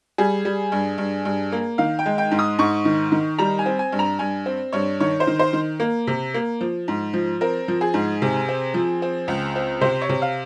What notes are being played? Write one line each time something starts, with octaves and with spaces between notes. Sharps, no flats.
G3 G#4
G3
G2
G2
G2
A#3
D#3 F5
G5
G#3
G5
G#2
D#6
G#2 C#6
D#3
D#3
G3 A#5
G#5
C4
G#5
G2
A#5
G2 G#5
C4
G2 C#5
D#3 C#5
C5
D#3
C5
D#3
A#3
C3
A#3
F3
G#2
F3
C4 A#4
F3
G#4
G#2
C3
C4
F3
C4
C#2
C4
C3 C5
C#5
C3
F5